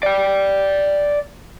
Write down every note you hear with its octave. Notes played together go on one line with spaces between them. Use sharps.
D5 G5